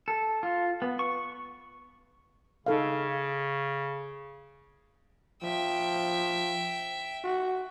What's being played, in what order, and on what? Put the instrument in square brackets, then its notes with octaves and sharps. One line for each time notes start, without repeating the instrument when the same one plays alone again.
[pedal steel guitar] A4
F4
B3
C#6
[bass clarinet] C#3 [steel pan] D#4 A4 F5
[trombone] F3 [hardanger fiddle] E5 G5
[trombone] F#4